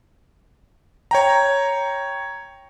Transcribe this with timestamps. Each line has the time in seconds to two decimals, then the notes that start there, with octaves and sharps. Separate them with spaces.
1.11 C#5 G5 A#5